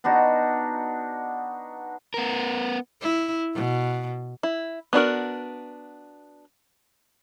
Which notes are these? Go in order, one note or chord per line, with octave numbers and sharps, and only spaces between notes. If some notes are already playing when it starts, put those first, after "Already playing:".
B3 D4 D#4 F#4
B3 A#4
E4
B2
E4
B3 D4 F#4 A#4